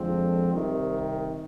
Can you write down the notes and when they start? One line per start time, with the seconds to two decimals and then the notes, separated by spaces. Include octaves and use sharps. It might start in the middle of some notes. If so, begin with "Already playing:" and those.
Already playing: F2 D3 F3 G#3 C4
0.53 C2 C3 D#3